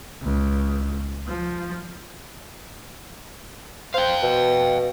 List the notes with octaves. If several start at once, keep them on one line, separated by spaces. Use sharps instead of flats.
C#2
F3
C5 F5 G5
B2